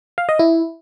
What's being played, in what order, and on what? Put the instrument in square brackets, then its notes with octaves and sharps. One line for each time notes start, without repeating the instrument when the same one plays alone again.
[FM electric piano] F5
D#5
E4